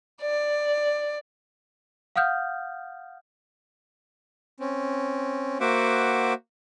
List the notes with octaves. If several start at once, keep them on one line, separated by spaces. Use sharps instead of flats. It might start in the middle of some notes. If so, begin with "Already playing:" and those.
D5
F5 F#5 D#6 F6 G6
C4 C#4
A#3 F#4 C5 E5 F#5 D6